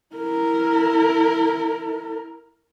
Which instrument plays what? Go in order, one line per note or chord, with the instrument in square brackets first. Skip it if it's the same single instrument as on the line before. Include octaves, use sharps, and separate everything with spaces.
[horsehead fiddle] E4 A#4